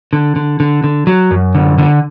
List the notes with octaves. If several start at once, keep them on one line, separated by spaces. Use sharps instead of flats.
D3
D3
D3
D3
F#3
F#2
D3
D3